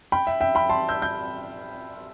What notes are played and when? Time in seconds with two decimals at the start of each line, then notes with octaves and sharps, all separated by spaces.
0.12 G5 B5
0.27 E5
0.41 E5 G5
0.55 G5 B5
0.70 A5 C6
0.88 E6 G6
1.02 G6